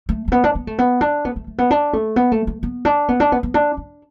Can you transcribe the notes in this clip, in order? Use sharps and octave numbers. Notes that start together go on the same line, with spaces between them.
A3
A3
B3
D4
B3
A3
B3
D4
B3
A3
A3
B3
D4
A3
B3
A3
A3
B3
D4
B3
D4
B3
B3
D4
D4